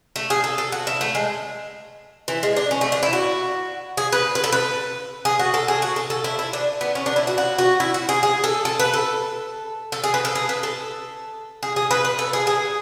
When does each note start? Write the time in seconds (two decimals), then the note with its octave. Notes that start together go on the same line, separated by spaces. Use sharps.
0.16 A3
0.30 G#4
0.44 A4
0.58 A4
0.72 F#4
0.87 E4
1.01 A3
1.15 G#3
2.28 E3
2.43 G#3
2.56 D4
2.71 C#4
2.81 A3
2.92 D4
3.03 E4
3.13 F#4
3.97 G#4
4.12 B4
4.35 B4
4.44 A4
4.52 B4
5.25 G#4
5.39 F#4
5.54 A4
5.68 G#4
5.82 F#4
5.96 A4
6.10 A4
6.24 E4
6.39 E4
6.53 D4
6.81 B3
6.95 C#4
7.06 D4
7.16 E4
7.27 F#4
7.38 F#4
7.58 F#4
7.80 E4
7.94 F#4
8.09 G#4
8.23 G#4
8.44 A4
8.65 A4
8.79 B4
8.94 A4
9.92 A4
10.04 G#4
10.14 B4
10.25 A4
10.35 G#4
10.49 B4
10.63 A4
11.63 G#4
11.76 G#4
11.91 B4
12.05 B4
12.19 A4
12.33 G#4
12.47 G#4